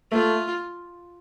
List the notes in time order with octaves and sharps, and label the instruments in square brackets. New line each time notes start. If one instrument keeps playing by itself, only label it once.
[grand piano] A3 [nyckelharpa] F4